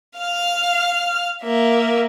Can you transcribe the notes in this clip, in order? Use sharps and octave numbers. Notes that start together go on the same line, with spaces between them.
F5 F6
A#3 E5